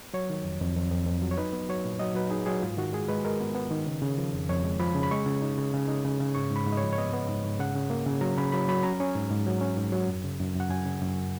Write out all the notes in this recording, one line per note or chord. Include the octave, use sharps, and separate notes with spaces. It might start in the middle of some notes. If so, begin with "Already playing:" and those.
F#3 C#5
D#3
F2
F2
F2
F2
F2
F#3
C#5
D#4 B4
B3
F#3 C#5
A#2
F#3 D#5
F#3 B4
D#4 G#4
F#3 G#4
G#2 F4
D#3 F#4
G#3 G#4
G#3 B4
G#3 A#4
B3
B3
D#3
C#3
C#3
F3
F2
F2 C#5
G#3
F3 B5
C#3
B5
G#3 C#6
C#3
D#4
C#3
C#3
D#4
C#3
C#3
G#2 C#6
G#2
B5
G#2
D#5
C#5
F3
C#5
B3 D#5
B3
G#2
G#2
C#3 F#5
C#3
A#3
C#3
F#3 A#5
C#3 B5
F#3 B5
F#3 B5
C#4 A#5
C#4
G#2
G#2
F#3
C#4
G#2
F#3
F#2
C#3
F#2
F#2 F#5
F#2 G#5
C#3
F#2